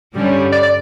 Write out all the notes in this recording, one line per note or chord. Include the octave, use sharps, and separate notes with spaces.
G2 D3 G3 C#4
D5
D5